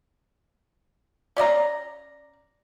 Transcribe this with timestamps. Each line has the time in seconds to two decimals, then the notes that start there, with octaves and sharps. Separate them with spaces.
1.37 C#4 D5 D#5 A#5